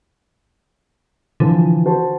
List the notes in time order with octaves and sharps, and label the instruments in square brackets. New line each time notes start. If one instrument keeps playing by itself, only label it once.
[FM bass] D3 [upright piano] E3 F3
[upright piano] F#4 C5 A5